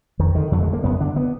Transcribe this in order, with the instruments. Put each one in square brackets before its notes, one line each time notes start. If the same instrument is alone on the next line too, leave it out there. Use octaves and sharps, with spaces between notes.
[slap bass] F2 D#3
D3 D#3
F2 F#3
G#3
D3
A#3
F#2 B3
D3 D4
B3